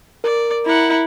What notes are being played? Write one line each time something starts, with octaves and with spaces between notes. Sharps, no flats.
A#4 D5
E4 F#5 A#5